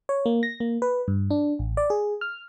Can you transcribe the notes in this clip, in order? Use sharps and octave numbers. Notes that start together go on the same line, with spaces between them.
C#5
A#3
A#6
A#3
B4
G2
D4
A1
D5
G#4
F6